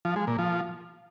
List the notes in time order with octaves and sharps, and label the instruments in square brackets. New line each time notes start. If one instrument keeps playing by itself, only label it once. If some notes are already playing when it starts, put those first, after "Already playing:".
[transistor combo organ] F3
G#3
A#2
F3